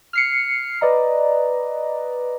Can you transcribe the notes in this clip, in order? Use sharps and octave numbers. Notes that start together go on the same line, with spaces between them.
F6 C7 C#7
B4 D5 D#5 A#5